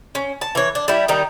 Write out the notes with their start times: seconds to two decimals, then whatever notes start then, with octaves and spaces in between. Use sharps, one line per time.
0.15 C#4
0.41 A5
0.55 E3 C#5
0.75 D4
0.88 G3 E4
1.08 D#3 G3 D#4